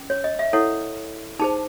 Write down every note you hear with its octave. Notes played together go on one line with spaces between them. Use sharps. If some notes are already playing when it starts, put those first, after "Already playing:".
Already playing: C#4
C#5
D#5
E5
E4 A4 C#5 F#5
D#4 G#4 C5 A5